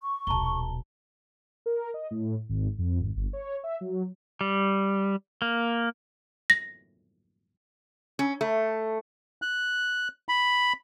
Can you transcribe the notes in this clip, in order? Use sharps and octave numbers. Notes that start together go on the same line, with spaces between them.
C#6
D#1 B1 A5 A#5 G7
A#4
D#5
A2
G#1
F2
G#1
G1
C#5
E5
F#3
G3
A#3
A#6
C#4
A3
F#6
B5